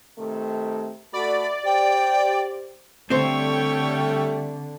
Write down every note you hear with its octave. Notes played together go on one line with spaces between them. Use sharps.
C3 D#3 A3
A3 F#4 D5 B5
G4 C5 G5
D3 G3 A3 C4 C5 C#5 G5